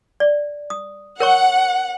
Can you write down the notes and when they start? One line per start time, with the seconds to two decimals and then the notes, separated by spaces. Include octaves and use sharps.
0.20 D5
0.70 D#6
1.20 A#4 C#5 F#5 C#6